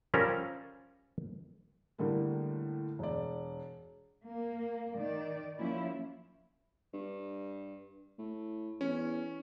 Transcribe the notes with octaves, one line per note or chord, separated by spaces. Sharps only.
F3 G3 C#4 A4 A#4 F5
A2 D3 G3 A#3
E1 D5
A#3
D#3 D5
F3 F#3 A#3 C#4 E4
G2
A2
E2 C#4